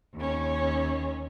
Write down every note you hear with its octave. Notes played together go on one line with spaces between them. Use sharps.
D#2 C#4